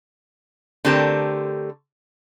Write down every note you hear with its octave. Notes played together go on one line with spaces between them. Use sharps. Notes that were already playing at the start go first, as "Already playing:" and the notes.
D3 A3 C4 G4 A#4 A5